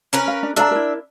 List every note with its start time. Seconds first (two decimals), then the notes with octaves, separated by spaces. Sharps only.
0.13 C#4 A#4 B4
0.28 F5
0.43 D4
0.56 D4 A4 E5 F5 A#5
0.71 E4 A#4